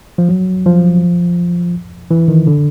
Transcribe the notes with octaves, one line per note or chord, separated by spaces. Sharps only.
F3
F#3
F3
E3
D#3
D3